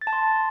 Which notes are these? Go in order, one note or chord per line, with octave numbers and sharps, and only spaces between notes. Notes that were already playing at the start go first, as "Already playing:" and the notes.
A6
A5
C6